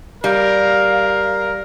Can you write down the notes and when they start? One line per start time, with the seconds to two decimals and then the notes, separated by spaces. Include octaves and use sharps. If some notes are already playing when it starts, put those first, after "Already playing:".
0.24 G3 A#4 F5